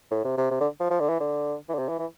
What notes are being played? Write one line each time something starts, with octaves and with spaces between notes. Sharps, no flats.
A2
C3
C3
C3
D3
F3
F3
D3
E3
D3
E3
D3
C3
E3
E3